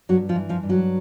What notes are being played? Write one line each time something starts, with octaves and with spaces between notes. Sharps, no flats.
G2 F#3 F#4
F3 F4
E3
F3 F4
G2
F#3 F#4